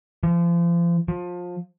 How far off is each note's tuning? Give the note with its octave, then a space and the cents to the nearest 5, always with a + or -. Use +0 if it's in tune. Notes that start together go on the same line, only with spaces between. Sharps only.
F3 -35
F3 +25